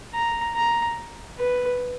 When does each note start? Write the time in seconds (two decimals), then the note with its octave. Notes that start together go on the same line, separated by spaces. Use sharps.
0.14 A#5
0.55 A#5
1.38 B4